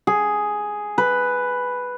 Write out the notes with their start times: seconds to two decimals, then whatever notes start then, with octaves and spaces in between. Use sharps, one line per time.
0.07 G#4
0.98 B4